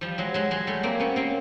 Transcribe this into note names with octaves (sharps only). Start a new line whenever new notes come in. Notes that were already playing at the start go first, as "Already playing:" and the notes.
F3 G3
F#3 G#3
F#3 G#3
F#3 G#3
G3 A3
A#3 C4
B3 C#4
A#3 C4